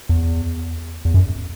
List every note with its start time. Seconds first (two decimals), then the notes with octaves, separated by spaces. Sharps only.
0.09 E2
1.05 E2
1.14 F#2